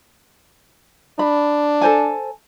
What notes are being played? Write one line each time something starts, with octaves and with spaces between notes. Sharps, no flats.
D4 B5
A4 C5 G#5